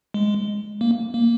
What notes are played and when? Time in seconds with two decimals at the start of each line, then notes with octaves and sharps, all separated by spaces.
0.14 G#3
0.81 A#3
1.14 A#3